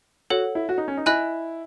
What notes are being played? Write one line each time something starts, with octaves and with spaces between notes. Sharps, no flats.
F#4 A4 C#5 F#5
E4
F#4
D#4
C#4
D#4
E4 D#5 G#5 B5 F#6